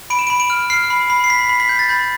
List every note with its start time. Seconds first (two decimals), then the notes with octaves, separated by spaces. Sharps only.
0.10 B5 D7
0.19 E7
0.27 B5 D7
0.40 D7
0.50 F6
0.70 F6 C7
0.90 B5
1.10 B5
1.24 C7
1.30 B5 B6
1.49 B5
1.60 B6
1.69 G6
1.79 A6
1.89 B5 G6